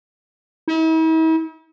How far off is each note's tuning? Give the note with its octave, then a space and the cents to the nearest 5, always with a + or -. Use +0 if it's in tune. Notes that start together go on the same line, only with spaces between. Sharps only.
E4 -45